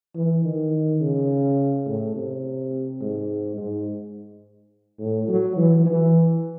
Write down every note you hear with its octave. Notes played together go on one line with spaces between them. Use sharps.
E3
D#3
C#3
A2
C3
G#2
G#2
A2
F#3
E3
E3